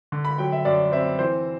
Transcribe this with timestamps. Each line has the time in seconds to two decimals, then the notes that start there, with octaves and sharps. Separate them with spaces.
0.12 D3
0.25 B5
0.38 F#3 G5
0.52 E5
0.65 F#2 D5
0.92 C4 E5
1.19 E3 C5